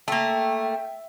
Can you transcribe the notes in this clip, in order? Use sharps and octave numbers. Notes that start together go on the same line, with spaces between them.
A3 A#3 E5 G5